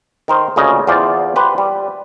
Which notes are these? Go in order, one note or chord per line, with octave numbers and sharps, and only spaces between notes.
D#3 A#4 C5
D2 A#2 C#3 D#5
E2 F4 C5 D5
G4 B4 C5
G3